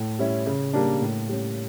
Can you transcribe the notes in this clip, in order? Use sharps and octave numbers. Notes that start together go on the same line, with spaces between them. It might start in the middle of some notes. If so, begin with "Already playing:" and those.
Already playing: A2
G3 C#4 E4
C#3
G3 A#3 D4
A2
G3 C#4